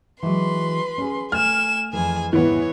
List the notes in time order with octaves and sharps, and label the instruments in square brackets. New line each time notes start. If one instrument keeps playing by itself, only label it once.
[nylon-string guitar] E3 F#3 G#3 [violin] B4 C6
[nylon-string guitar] C#4 G#4
[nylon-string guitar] A3 [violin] G#5 E7 [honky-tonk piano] F6
[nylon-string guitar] F2 E3 [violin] G#4 G#5
[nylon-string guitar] E2 G#2 C3 [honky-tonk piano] E3 B3 [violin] C#5